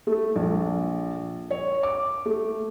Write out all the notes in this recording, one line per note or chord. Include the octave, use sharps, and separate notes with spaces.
A3
A#1
C#5
D6
A3